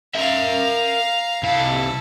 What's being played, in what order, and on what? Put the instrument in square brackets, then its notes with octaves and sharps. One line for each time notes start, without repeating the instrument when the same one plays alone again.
[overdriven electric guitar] A#4 E5 [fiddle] F5 A#5
[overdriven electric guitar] C2 F5 [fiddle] E4 A4